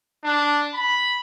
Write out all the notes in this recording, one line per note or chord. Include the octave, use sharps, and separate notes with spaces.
D4
B5